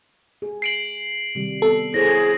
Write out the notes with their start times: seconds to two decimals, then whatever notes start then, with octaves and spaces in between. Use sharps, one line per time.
0.42 G#4
0.62 C7 D7 F#7
1.35 C3 D#3 G3
1.62 B3 A4
1.94 E4 G#4 C5 C#5 A#6